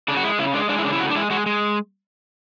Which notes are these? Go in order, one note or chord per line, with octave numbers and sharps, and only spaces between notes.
C#3 D4
F#4
G#3 E4
C#3 E4
G#3 D4
G#3 D4
E4
C#3 D4
E4
A2 F#4
D4
G#3 E4
G#3 F#4
G#3